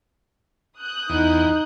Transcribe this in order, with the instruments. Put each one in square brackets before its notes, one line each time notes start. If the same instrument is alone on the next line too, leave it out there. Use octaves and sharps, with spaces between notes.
[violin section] D#6 F#6 G6
[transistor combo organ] E2 [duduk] D#4